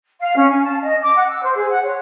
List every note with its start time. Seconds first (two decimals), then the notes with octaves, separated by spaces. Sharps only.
0.20 F5
0.36 C#4
0.49 G#5
0.64 A5
0.83 D#5
1.03 D6
1.16 F#5
1.28 E6
1.43 C5
1.55 G#4
1.70 F#5
1.83 C#5